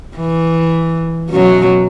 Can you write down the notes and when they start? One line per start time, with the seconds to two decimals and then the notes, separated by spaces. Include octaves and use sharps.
0.17 E3
1.30 F#2 B2 F#3